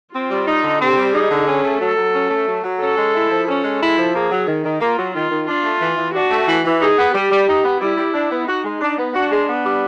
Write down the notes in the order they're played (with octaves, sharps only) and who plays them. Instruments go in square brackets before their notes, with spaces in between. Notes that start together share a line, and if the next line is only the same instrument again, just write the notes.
[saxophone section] C4 [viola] F4
[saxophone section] G3
D#4
D3
[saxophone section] C4 [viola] G4
[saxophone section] G3
[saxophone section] D#4 [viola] G#4
[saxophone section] D3
C#4
A3
[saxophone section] F#3 [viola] A4
[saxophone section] F#3
C#4
A3
F#3
F#3
[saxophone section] C#4 [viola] A4
[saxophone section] G#3
E4
F3
[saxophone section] C#4 [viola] A4
[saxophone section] G#3
E4
F3
[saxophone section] A#3 [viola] G#4
[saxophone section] F#3
D#3
D#3
[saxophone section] A#3 [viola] F4
[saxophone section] F#3
[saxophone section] D#3 [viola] F4
[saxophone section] D#3
[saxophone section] D4 [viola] F4
[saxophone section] A3
E3
E3
[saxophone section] D4 [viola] F#4
[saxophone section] A3
E3
E3
[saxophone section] D#4 [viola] G#4
[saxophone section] B3
[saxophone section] G3 [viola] G4
[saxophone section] G3
D#4
B3
[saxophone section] G3 [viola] E4
[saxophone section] G3
D4
B3
[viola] D#4 [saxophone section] F#4
[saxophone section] G#3
D4
B3
[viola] D4 [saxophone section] F#4
[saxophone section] G#3
B3
G3